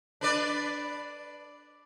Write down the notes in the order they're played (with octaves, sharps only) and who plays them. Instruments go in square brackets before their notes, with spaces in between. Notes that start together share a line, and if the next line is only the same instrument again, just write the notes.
[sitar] D4 B4 D5